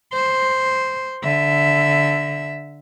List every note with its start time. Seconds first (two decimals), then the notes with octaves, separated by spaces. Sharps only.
0.13 C5
1.24 D3 E5